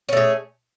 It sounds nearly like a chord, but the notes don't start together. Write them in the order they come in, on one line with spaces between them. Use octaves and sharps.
C#4 A3 G#4